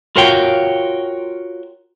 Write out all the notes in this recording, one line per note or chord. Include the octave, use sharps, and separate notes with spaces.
F4 F#4 A#4 C#5 F5 G5